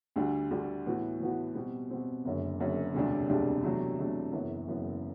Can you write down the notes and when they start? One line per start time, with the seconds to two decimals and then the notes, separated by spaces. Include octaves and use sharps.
0.16 D2 D3 G3
0.51 D2 D3 G3
0.86 A2 E3 B3 F#4
1.20 A2 E3 B3 F#4
1.55 B2 G3 C4
1.90 B2 G3 C4
2.25 F#1 F#2 D3
2.60 F#1 F#2 D3
2.94 E1 D2 C3 G3 D4
3.29 E1 D2 C3 G3 D4
3.63 E2 C3 F#3 A3 D4
3.99 E2 C3 F#3 A3 D4
4.33 F#1 F#2 E3 B3
4.68 F#1 F#2 E3 B3